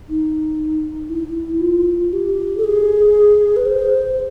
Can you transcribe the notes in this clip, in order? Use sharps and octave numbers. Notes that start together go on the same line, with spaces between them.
D#4
E4
F4
G4
A4
G#4
B4
C5